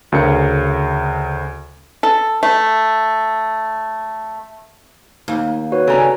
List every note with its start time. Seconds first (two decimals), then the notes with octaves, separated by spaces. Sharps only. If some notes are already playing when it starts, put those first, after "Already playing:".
0.12 D2 C#3 A#4 C#7
2.03 A4
2.43 A3
5.28 D#2
5.72 F#4 B4 C#5
5.87 C#3 G3 C#4 A4 A#5